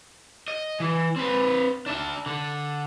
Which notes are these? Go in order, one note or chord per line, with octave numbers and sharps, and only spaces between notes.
D#5
E3
C4 B4
D4 E5
D3